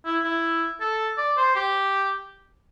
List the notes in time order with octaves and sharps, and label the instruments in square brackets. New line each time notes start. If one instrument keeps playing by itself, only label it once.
[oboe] E4
E4
A4
D5
C5
G4